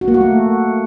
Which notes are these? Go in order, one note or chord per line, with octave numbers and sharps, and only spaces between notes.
F#4
A#3
F#4
A3